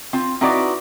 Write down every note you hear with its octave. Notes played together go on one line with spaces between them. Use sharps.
C4 F4
C4 D#4 E4 F#4 B4 D5